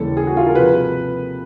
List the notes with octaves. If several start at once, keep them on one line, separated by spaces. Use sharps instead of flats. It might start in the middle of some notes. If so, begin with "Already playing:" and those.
Already playing: D#2 C#3 E3 G3 A4
G#4
F#4
F4
A#4
C3 F3 B4